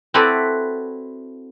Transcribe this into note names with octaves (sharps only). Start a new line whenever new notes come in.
C4 E4 F#4 A4 B4 D5